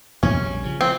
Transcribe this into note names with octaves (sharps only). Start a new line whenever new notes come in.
E2 B2 A#3 C#4
A#1 G3
C#3 F3
F3 C4